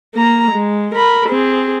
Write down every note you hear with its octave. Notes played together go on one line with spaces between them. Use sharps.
A#3 A#5
G#3
A#4 B5
C4 G#4